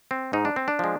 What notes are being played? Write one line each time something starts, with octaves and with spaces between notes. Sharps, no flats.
C4
G#2 D#4
D4
C4
D4
F3 G#3